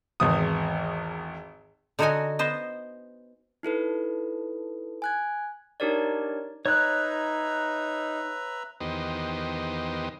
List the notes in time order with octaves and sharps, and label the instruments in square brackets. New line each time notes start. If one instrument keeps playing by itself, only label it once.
[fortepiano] G#1 E2 D#6
[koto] D3 D#4 F#4 C#5 D#5 G#5
B3 C5 D#5
[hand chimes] D#4 E4 A4 B4
G#5 F#6 G#6
[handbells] D4 D#4 G4 A#4 C#5 D5
[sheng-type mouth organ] D#4 [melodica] B4 E5 A#5 [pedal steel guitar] C#5 F#6
[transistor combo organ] E2 D#3 B3 G4 C5 D#5